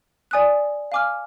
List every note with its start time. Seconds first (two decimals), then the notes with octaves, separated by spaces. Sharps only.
0.31 D5 G#5 D#6 F#6
0.92 F5 G#5 D6 F6